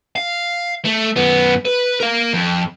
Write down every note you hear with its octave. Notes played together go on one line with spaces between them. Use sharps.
F5
A3
F#2 B3
B4
A#4 F5
F2